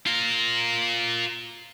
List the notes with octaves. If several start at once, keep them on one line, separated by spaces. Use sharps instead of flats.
F4 A#4